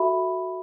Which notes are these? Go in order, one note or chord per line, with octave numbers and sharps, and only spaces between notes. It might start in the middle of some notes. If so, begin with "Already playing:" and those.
Already playing: F#4 A4 E5 B5